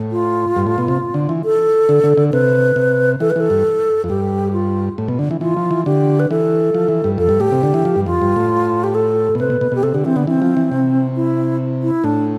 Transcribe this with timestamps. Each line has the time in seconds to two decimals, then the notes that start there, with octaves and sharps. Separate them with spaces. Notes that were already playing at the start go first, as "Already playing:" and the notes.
Already playing: A2
0.12 F4
0.56 G2
0.67 A2
0.78 B2
0.88 C3
1.14 D3
1.29 E3
1.44 A4
1.89 D3
2.04 D3
2.18 D3
2.32 C3 B4
2.76 C3
3.20 E3 A4
3.30 B4
3.36 E3 A4
3.50 G2
4.04 F2
4.09 G2 G4
4.53 F4
4.98 A2
5.08 B2
5.19 D3
5.31 E3
5.41 E3 F4
5.57 F3
5.71 E3
5.86 D3 G4
6.19 B4
6.30 E3 A4
6.74 F3
6.89 E3
7.04 G2
7.18 F2 A4
7.29 G2
7.40 A2 G4
7.52 C3
7.63 D3
7.74 E3
7.85 F3
7.96 G2
8.06 F2 F4
8.22 G2
8.36 A2
8.84 G4
8.95 A4
9.35 B2
9.39 C3 B4
9.50 B2
9.61 B2
9.72 B2 G4
9.83 C3 A4
9.94 D3 G4
10.05 E3 C4
10.16 D3 B3
10.27 E3 C4
10.42 F3
10.57 E3
10.72 C3
11.16 E4
11.82 E4
12.04 A2 D4